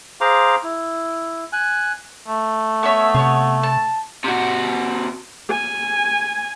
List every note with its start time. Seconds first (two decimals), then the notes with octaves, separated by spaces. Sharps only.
0.21 G#4 C5 F5 A#5 C6 D6
0.63 E4
1.53 G#5 F#6
2.28 A3
2.83 B3 C#5 E5
3.15 C3 B3 C#5
3.63 A5
4.24 C3 F#4
5.51 G#5